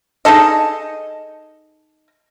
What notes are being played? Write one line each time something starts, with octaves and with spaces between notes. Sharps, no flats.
D#4 G#4 A4 D#5